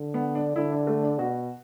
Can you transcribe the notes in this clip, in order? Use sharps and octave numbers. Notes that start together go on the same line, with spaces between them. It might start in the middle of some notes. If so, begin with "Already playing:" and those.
Already playing: D3
B3
D4
D3 E4
D4
A3
D4
B2 F#4